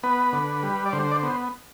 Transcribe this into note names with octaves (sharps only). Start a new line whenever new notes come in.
B3 B4
D3
G3
D5
D3 C5
D5
C5
B3